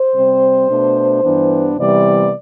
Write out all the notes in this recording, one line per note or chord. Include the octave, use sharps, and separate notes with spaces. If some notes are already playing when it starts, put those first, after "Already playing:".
Already playing: C5
C3 G3 C4
B2 A3 D4
G2 E3 B3 D4
C3 E3 G3 B3 D5